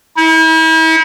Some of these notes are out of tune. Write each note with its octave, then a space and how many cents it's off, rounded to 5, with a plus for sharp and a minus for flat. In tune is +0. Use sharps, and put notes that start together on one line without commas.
E4 -40